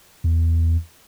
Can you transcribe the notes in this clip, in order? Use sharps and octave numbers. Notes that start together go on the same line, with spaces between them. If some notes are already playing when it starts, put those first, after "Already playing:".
E2